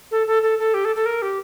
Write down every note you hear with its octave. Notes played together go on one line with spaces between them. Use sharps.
A4
A4
A4
A4
G4
A4
A4
A#4
G4